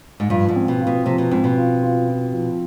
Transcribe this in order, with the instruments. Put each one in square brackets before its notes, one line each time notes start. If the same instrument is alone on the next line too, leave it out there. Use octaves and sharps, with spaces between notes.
[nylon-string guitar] G#2
[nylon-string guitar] G2 [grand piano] F3
[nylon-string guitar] G#2
[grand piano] C4
[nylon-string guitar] B2
[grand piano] F4
[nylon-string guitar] B2
[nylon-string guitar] C3 [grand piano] F3
[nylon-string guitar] B2
[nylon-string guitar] G#2 [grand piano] C4
[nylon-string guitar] B2
[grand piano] F4
F4
F4
F3